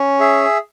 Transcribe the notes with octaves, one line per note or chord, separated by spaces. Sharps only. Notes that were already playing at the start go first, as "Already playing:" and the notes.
Already playing: C#4
G#4 E5